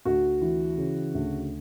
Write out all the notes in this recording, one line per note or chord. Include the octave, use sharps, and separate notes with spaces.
D2 F#4
E3
C#3
D2